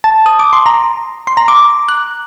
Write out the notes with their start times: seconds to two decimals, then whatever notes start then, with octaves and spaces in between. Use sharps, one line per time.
0.04 A5
0.26 D#6
0.39 D6
0.53 C6
0.66 A#5
1.27 C6
1.37 A#5
1.48 D6
1.89 F#6